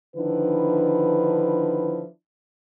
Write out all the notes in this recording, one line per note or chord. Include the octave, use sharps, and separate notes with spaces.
D3 D#3 F3 D4 E4 B4